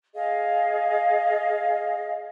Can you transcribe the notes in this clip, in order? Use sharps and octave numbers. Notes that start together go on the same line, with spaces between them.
G#4 D#5 F5